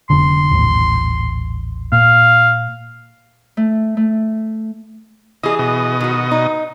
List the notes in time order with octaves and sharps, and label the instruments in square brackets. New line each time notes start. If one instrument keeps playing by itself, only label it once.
[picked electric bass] F1 D3 [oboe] C6
[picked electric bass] D#1 A1
[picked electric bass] A#2 [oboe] F5
[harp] A3
A3
[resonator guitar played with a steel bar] E3 G#4 [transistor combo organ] D#5
[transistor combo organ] B2 D#5
[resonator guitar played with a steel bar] D#3 F#4
D#4